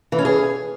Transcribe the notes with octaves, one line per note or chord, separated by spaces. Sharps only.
E3
C#4
G#4